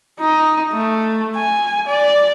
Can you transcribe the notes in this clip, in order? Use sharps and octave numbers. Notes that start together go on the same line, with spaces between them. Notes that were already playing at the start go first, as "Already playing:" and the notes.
D#4
A3
G#5
D5